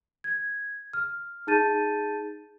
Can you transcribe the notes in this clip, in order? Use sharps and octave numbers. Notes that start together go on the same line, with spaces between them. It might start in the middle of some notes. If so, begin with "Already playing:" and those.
G#6
F6
D#4 G#4 A5 G6 A6 D#7